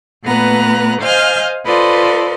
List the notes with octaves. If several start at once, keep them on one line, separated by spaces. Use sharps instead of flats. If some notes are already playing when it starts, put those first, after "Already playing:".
A#2 A3 B3 B4 A#5 F#6
C5 D#5 F5 G#5 F6 G6
F4 A4 B4 C5 D5 D#5